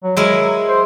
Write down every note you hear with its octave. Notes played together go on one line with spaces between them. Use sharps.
F#3
F#3 G#3 E4 A#4
C5